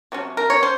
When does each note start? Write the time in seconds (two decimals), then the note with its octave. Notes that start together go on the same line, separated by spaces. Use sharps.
0.12 C3 F#3 C#4
0.37 A#4
0.50 C#5
0.63 C#4 C5